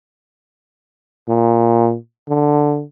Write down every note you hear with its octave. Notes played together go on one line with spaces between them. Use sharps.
A#2
D3